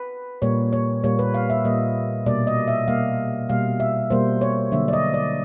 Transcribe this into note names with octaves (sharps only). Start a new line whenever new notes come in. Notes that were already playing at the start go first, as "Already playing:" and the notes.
Already playing: B4
A#2 G3 A#3 C#5
C#5
A#2 G3 A#3 C#5
B4
F5
E5
A#2 G3 A#3 D#5
B2 G3 A#3 D5
D#5
E5
B2 G3 A#3 F5
B2 G3 A#3 F5
E5
B2 G3 A#3 C5
C#5
D3 F#3 A#3 E5
D5
D#5
D5